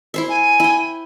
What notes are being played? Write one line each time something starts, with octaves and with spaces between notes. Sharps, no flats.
E4 C5 E5
G#5
E4 G5